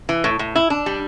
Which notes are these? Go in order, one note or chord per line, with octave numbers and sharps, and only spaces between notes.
E3
A2
A2
E4
D4
G3